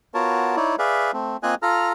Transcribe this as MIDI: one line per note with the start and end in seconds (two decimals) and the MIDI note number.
0.14 0.56 59
0.14 0.56 65
0.14 0.56 66
0.14 0.56 70
0.14 0.56 73
0.14 0.56 81
0.56 0.76 63
0.56 0.76 64
0.56 0.76 73
0.56 0.76 74
0.79 1.11 68
0.79 1.11 71
0.79 1.11 74
0.79 1.11 76
0.79 1.11 77
1.13 1.37 57
1.13 1.37 60
1.43 1.55 58
1.43 1.55 60
1.43 1.55 65
1.43 1.55 75
1.43 1.55 80
1.43 1.55 90
1.62 1.93 65
1.62 1.93 69
1.62 1.93 82
1.62 1.93 89